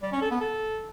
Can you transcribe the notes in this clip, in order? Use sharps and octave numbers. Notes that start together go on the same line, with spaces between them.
G3
C#4
A4
B3
A4